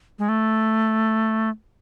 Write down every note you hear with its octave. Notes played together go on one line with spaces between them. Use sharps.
G#3
A3